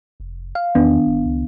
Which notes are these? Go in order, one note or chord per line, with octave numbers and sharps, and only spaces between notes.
F1
F5
E2 D#3 B3 D4
G1
C#2